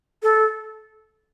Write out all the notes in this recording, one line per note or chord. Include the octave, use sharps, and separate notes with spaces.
A4